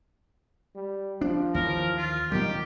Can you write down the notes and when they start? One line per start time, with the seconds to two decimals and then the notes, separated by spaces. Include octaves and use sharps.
0.75 G3
1.21 F3 D4
1.54 D#2 D#3 E3 A#4
1.97 F4
2.32 A#2 D#3 F#3 G3 G4